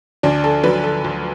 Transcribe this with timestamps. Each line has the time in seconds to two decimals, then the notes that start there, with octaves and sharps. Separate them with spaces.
0.23 D2 D4
0.44 A4
0.63 D3 F#3 B4
0.84 A4
1.04 D2